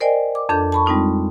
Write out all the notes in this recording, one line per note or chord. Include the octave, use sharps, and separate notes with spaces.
A#4 C5 D5 D#5 G5 G#5
D6
F2 D4 A4 G6
A5 B5 C#6
G3 G#3 C4 D#4 F4